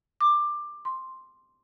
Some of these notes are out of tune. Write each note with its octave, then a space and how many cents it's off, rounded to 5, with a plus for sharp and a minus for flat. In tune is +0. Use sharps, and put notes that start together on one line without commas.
D6 +15
C6 +5